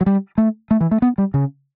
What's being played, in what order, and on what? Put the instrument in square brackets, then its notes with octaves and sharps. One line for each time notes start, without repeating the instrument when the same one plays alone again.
[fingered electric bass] F#3
G3
A3
A3
E3
A3
B3
G3
C#3